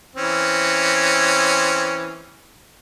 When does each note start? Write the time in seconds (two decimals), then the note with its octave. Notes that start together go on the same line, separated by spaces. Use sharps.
0.16 E3 C4 C#4